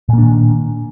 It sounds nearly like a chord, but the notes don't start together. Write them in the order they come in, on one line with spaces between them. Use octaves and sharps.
A#2 A#3 D4 D#3